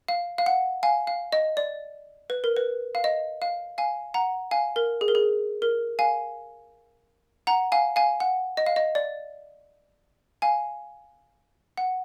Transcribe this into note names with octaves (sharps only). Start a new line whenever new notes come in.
F5
F5
F#5
F5 G#5
F5
D#5
D5
B4
A#4
B4
F5
D#5
F5
F5 G#5
F#5 A#5
F5 G#5
A#4
G#4
A#4
G#4
A#4
F5 G#5
F#5 A#5
F5 G#5
F5 G#5
F#5
D#5
F5
D#5
D5
F5 G#5
F#5